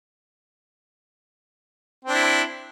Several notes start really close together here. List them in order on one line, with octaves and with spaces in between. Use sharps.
C4 D4 E4